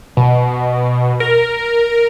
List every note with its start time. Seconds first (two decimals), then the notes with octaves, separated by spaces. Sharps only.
0.17 B2
1.20 A#4